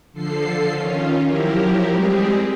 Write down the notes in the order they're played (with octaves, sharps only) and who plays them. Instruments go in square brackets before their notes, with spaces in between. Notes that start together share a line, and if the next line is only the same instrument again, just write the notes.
[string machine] D3 F3 A4 C7
D#3 C#4 F4
F3 F#3 E4 G4 A#4
G3 G#3 C4 G4 G#4